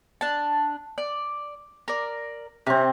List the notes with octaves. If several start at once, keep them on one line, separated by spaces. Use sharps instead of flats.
D4 A5
D5
A#4 D5
C3 C4 C#4